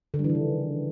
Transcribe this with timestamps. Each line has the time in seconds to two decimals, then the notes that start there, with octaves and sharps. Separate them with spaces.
0.14 D3
0.19 G3
0.24 E3
0.30 D#3
0.35 C#3